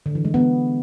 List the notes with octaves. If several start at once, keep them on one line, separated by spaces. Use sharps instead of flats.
D3
E3
G#3
B3